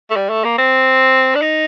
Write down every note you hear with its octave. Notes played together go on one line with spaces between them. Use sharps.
A3
G3
A3
A#3
C4
D4
D#4